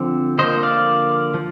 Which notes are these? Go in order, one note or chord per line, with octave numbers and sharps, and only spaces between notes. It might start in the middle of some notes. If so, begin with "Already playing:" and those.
Already playing: D3 F3 C4
D3 F3 A#3 C5 D#5
D5 F5
F3